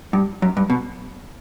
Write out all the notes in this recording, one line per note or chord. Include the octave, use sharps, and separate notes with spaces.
G2
F#2
G2
B2